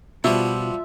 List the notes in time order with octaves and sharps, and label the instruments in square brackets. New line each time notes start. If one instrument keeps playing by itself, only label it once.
[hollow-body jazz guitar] B2 [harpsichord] F3 G3 B3 [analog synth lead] F4 [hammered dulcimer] E5